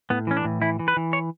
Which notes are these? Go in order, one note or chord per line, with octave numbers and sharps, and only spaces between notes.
A2 B3
E3 C#4
D4
A2
E3 E4
E3
B4
E3
C#5